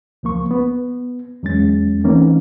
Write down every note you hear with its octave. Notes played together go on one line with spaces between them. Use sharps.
C#2 F3 A#3 C#6
B3
E2 F#3 G#3 C#4 A6
E3 A3 A#3 C4 C#4 D#4